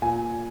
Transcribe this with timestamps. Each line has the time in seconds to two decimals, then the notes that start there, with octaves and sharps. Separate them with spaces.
0.02 A#2 G#5